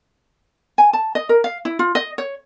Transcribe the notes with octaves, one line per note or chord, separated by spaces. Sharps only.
G#5
A5
D#5
A#4
F5
E4
F4
D#5
C#5